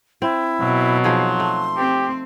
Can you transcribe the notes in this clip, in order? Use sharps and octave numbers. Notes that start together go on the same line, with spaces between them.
C4 E4
B2 F#3
F3 D#4 G#4 C6
A3
C4 G4